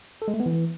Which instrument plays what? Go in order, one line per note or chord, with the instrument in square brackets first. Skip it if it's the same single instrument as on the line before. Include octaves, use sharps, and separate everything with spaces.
[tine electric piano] A4
G#3
A3
B3
E3